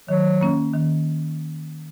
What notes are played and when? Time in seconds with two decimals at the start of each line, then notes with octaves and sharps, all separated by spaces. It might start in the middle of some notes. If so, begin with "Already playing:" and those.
0.08 D#3 F#3
0.41 A#3 C#4
0.74 D#3